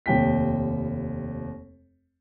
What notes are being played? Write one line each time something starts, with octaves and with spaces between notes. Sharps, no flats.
F1 D#2 G5 B6